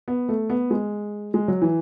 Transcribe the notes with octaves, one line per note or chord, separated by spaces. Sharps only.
B3
A3
B3
G#3
G#3
F#3
E3